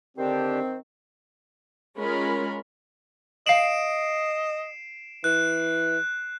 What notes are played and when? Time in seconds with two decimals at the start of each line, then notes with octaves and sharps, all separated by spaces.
0.18 D3 D#3 C4 D4 G4 C5
1.98 G#3 C#4 F4 A#4 B5
3.46 D#5 F5 C7 D7 E7 F#7
5.24 E3 F#6